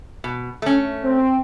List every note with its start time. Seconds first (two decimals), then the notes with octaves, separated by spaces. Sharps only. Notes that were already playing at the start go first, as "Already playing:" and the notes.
0.24 B2
0.62 A3 C#4
1.04 C4